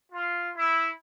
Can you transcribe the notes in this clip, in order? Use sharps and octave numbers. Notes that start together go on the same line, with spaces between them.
F4
E4